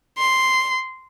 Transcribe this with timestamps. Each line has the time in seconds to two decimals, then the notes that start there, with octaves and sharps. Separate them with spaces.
0.18 C6